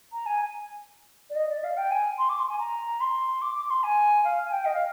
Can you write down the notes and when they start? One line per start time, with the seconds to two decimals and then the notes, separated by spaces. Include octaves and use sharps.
0.13 A#5
0.26 G#5
1.30 D5
1.35 D#5
1.49 D5
1.64 F5
1.77 G5
1.91 G#5
2.18 C6
2.29 D6
2.39 C6
2.49 G#5
2.59 A#5
3.00 C6
3.42 D6
3.55 D6
3.66 D6
3.70 C6
3.83 G#5
4.24 F5
4.44 G#5
4.52 G5
4.65 D#5
4.73 F5